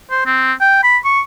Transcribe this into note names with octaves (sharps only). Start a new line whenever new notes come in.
C5
C4
G5
B5
C#6